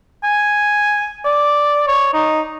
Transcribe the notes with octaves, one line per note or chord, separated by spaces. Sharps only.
G#5
D5
C#5
D#4